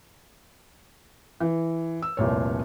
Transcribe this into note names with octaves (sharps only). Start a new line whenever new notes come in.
E3
E6
F1 C2 A#2 C#5